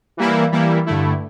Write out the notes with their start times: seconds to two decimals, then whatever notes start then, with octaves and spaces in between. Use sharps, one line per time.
0.17 E3 G3 A#3 E4
0.52 E3 G3 A#3 E4
0.86 G2 D3 A3 E4